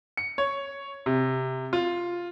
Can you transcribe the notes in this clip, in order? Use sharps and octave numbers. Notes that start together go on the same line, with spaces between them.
C#7
C#5
C3
F4